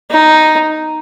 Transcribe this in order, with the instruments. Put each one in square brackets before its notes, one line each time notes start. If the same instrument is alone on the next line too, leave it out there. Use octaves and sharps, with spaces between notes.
[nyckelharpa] D#4